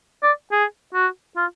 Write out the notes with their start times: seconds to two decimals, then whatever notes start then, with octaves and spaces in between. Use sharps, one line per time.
0.23 D5
0.51 G#4
0.94 F#4
1.37 F4